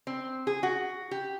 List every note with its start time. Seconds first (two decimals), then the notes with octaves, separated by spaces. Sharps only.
0.07 C4
0.47 G#4
0.63 F#4
1.11 G4